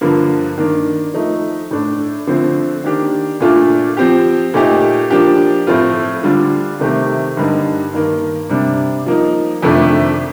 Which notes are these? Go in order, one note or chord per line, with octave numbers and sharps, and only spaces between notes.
G2 D3 F3 A#3
D#3 A#3 D4
F3 A3 D#4
A2 A3 D4
D3 F3 A3 C4
D#3 A#3 D4 G4
A#2 A3 D4 F4
F3 C4 G4
A#2 A3 D#4 G4
F3 A#3 D4 G4
A2 F3 A3 C4 F4
D3 G3 D4 F4
C3 D#3 A3 C4 G4
G2 D3 G3 A#3 D#4
G2 D#3 A#3
C3 G3 D4
F3 A#3 D#4
F2 C3 D#3 A3 D4